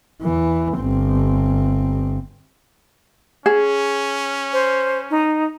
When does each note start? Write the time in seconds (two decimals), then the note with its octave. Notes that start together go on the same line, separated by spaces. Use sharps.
0.22 E2 E3
0.75 G1 C4
3.46 C#4 G#4
4.53 C5
5.11 D#4